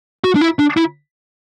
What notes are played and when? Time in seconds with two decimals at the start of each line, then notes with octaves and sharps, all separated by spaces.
0.24 F#4
0.35 D4
0.41 E4
0.59 D4
0.77 E4